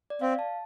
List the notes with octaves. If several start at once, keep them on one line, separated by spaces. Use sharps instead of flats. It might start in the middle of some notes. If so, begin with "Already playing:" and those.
D5
C4 F5
A5